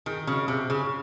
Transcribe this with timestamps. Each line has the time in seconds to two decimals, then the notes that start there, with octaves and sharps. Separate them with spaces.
0.06 D#3 G#4
0.27 C#3 F#3
0.48 C3 G#4
0.70 C#3 G#4